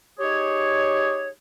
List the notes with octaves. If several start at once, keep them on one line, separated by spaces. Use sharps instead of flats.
D#4 G4 G#4 C#5